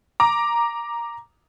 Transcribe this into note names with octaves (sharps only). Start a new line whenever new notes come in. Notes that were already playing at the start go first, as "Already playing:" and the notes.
A#5 D6